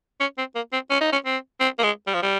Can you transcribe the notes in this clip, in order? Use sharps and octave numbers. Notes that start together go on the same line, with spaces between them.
C#4
C4
A#3
C4
C#4
D#4
C#4
C4
C4
A#3
G#3
G3
F3
G3